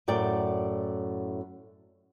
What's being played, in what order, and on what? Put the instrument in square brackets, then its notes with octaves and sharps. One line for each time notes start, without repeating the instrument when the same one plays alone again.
[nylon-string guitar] F#2 A2 D5 G5